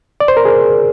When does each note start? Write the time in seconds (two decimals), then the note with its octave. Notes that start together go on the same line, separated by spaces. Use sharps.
0.20 D5
0.28 C5
0.37 A#4
0.45 G#4